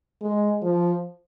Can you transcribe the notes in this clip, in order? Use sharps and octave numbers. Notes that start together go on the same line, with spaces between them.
G#3
F3